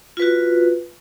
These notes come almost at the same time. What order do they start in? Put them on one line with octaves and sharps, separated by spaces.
F4 B4 F#4